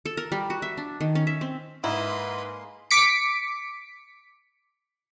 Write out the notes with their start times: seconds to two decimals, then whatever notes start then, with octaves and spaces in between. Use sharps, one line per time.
0.05 A4
0.17 A#4
0.32 G3
0.50 F#4
0.62 E5
0.77 D4
1.01 D#3
1.15 C#4
1.27 E5
1.41 C4
1.84 G#2 G#3 A#3 E4 B4 D#5 C6
2.91 D6 B6 C#7 D7